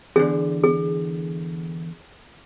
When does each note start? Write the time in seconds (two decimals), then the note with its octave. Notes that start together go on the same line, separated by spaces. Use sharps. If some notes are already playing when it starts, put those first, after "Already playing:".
0.16 E2 D3 G#4
0.64 G#4